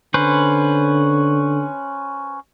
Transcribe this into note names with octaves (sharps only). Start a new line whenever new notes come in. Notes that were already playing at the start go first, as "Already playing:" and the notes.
D3 C#4 B4 C5